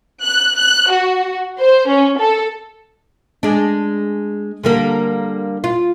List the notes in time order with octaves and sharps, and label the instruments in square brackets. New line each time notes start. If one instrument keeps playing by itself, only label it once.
[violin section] F#6
F#6
F#4
C5
C#4
A4
[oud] G#3 D4
D3 G3 A#3
F4